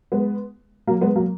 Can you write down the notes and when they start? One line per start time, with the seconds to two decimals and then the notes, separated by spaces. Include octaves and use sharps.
0.12 G#3 B3
0.87 F#3 A#3
1.01 G#3 B3
1.16 F#3 A#3